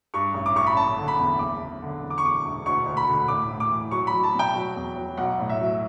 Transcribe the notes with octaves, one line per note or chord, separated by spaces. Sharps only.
G2 C#6
A1
D6
A1 C#6
B5
F#1 A5
D3
B5
E2
F#1 D6
F#1
D3
E2
D6
C#6
E2 D6
E1
D2 C#6
D2
B5
D3
A2 D6
A2
D6
E3
F#3 C#6
B5
F#3
A5
B2
G5
F#3
E2
F#3
B1 F#5
A2
E5
F#3